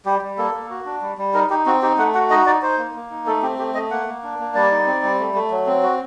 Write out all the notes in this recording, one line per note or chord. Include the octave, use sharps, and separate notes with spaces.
G3 G4
G3
A#3 A4
A#3
F#4
D4
G3
G3
D#4 A#4
D#4 G4
C4 F#4
D#4 G4
A3 F#5
F#4 F#5
D#4 D#5
D#4 D5
D#4 C5
A#3
A#3
D#4
A3 A4
C4 G4
A3 G4
A3 D#5
A#3 F#5
A#3
D4
A#3
G3 D5
D#4
C4
G3
A3
A3
F#3
C4
F#4